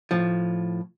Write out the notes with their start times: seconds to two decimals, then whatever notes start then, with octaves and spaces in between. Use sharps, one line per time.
0.11 A2 F3